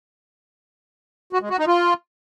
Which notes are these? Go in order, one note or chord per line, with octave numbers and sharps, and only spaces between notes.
F#4
G#3
F#4
D#4
F4